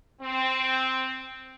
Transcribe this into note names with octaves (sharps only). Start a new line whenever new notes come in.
C4